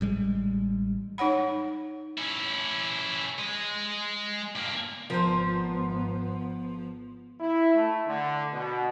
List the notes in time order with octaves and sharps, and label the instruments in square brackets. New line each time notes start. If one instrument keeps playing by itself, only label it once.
[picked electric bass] A1 G3 G#3
[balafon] D#4 C#5 F#5 B5
[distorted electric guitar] C#4 E4
G#3 D#5
G2 A#3
[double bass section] G#1 B3 [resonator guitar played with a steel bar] F3 [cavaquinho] A#4 C5
[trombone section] E4
A3
D3
B2